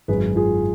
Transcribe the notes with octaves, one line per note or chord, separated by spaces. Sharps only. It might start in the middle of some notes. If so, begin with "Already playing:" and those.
G#1 F#2 D#3 G#4 B4
F4 G#4